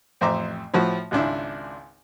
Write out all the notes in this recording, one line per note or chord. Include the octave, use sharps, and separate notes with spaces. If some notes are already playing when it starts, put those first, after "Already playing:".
A1 F2 C5 E5 A#5 D6
A2 F3 F#4
G#1 C#2 D4 E4